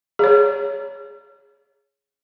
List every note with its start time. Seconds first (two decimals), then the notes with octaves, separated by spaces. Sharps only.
0.19 G#4 C#5